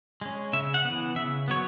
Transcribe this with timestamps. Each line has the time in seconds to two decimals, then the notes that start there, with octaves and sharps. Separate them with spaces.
0.21 G#3 C#4
0.53 C#3 E5
0.74 F#5
0.85 E3 B3
1.16 C#3 E5
1.48 F#3 B3 C#5